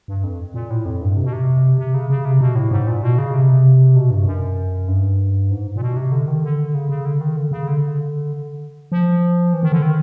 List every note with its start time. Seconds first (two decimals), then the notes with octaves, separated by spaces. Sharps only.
0.08 G2
0.24 F2
0.54 A#2
0.70 A2
0.85 F2
1.02 G2
1.17 C3
1.25 B2
1.33 C3
1.78 C3
1.94 C#3
2.10 C#3
2.25 C3
2.41 B2
2.55 A2
2.71 G#2
2.87 A#2
3.02 B2
3.18 C#3
3.34 C3
3.96 B2
4.11 G2
4.26 F#2
4.88 G2
5.51 G#2
5.76 A#2
5.82 B2
5.97 C3
6.12 D3
6.28 D#3
6.44 D3
6.74 C#3
6.89 C#3
7.05 D3
7.21 D#3
7.36 D3
7.51 C#3
7.68 D3
8.92 F3
9.53 E3
9.63 D#3
9.72 D3
9.82 D#3